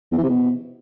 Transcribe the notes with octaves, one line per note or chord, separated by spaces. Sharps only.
E2
E3
C3
B2